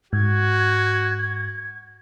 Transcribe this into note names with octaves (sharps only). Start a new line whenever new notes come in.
G#2 F#4 G#6